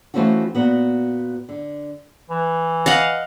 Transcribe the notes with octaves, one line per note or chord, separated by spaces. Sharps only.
E3 A3 C4 C#4 F4 F#4
A#2 B3 F#4
D3
E3
D#5 F5 F#5